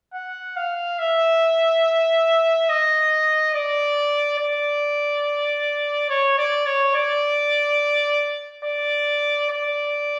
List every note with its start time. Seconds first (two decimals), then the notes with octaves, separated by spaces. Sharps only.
0.14 F#5
0.56 F5
0.99 E5
2.69 D#5
3.54 D5
4.39 D5
6.10 C#5
6.38 D5
6.66 C#5
6.95 D5
8.65 D5
9.50 D5